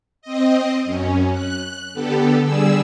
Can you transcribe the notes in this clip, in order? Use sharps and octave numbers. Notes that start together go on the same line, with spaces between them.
C4 D#5
F#2 C#4
F#6
D3 B3 G4 A4
D3 G3 G#4 E6